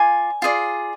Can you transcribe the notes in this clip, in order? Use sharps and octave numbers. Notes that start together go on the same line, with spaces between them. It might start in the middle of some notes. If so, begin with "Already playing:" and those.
Already playing: F4 D5 G#5
F4 G#4 D5